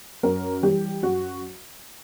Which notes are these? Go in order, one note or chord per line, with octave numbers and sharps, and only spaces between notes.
F#2 A#4
E3 G3 G4
F#2 F#4